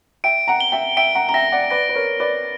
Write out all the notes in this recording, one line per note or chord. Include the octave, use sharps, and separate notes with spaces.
E5 G5 D7
F#5 A#5
G7
E5 G5
E5 G5 D7
F#5 A#5
A#5
E5 G5 A#6
D5 F#5
B4 D5 A#6
B4
A#4 C#5
A#6
B4 D5